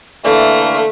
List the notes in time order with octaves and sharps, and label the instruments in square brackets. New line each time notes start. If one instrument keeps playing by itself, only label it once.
[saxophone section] D3 E3 A#3 [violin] A3